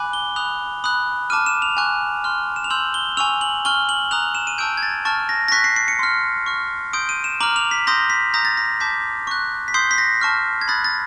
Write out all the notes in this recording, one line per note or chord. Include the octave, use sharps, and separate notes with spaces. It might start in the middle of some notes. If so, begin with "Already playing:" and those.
Already playing: G#5 B5 D6 F#6
G7
B5 D#6 F#6 F7
B5 D#6 F#6
A5 D6 F6 D#7
E7
F7
G#5 C#6 F#6
C6 F6
E7
F7
C6 E6 G6 F#7
G7
G#5 C#6 E6 F7
F#7
G#5 C#6 F6 G7
F#7
A#5 D#6 F#6 F7
E7
D#7
A5 C#6 E6 G6 D7
G#6
A6
A5 C#6 F6 A6
A#6
A#6
C#6 F#6 B6
C7
C7
C#7
C6 F6
C#6 F6
C6 D#6 G6 D7
D#7
E7
A#5 D6 F6 F#7
F7
B6
C6 D#6 G6 A#6
B6
A#5 D#6 G6 A#6
A6
A#6
A5 D6 G6 B6
C#6 F#6
B6
C6 D#6 G6 C7
B6
A#6
A5 C#6 F6
G#6
B5 D#6 F#6 A6
A6